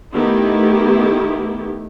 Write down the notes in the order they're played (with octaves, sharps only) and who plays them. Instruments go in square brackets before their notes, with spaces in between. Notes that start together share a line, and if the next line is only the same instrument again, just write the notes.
[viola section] D#3 A3 B3 E4 G4